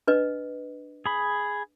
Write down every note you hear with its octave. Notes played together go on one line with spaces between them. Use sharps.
D4 B4 D#5
G#4 B5